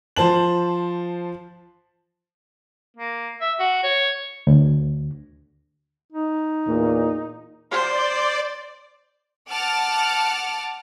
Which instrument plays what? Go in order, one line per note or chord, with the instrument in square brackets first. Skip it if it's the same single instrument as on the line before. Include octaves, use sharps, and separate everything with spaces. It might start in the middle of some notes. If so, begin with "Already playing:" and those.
[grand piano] F3 C5 A5 F#7
[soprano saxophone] A#3
E5
F#4
C#5
[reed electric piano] D2
[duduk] D#4
[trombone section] E2 A#2
[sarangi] C5 [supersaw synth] D5
[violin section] F#5 A5 D6 F6